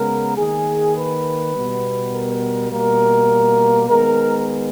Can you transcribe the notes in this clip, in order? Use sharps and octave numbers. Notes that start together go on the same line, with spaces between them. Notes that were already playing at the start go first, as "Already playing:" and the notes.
Already playing: C#3 G#3 B3 A#4
D#3 A#3 G#4
B4
B2 G3 B3
A#4
B2 G3 A#3 A#4
D#3 G#3 B3 A#4